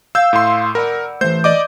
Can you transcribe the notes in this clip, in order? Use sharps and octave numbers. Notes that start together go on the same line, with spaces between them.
F5 E6 G6
A2 C6
A#4 D5 F#5 B5
E3 A3 C5 G6
D5 D#5 D6